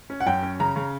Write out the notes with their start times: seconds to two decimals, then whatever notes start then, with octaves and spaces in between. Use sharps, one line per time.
0.10 C#4
0.20 F#5
0.26 F#2 G5
0.43 C#4
0.60 C#3 A#5
0.76 C#3